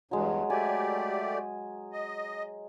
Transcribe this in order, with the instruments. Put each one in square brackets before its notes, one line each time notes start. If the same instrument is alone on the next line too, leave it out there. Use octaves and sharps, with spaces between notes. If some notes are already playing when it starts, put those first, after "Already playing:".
[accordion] E2 G2 [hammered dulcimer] F#3 G#3
[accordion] A3 G4 D5 [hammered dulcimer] G#5
[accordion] D#5